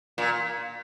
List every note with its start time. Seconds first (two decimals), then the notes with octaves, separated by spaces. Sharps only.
0.18 A#2